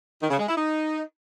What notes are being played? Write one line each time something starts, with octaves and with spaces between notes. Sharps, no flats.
D#3
C#3
G#3
E4
D#4